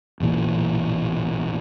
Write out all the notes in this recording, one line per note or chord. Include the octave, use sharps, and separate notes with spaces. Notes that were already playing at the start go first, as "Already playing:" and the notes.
E1 A1 A#2 E3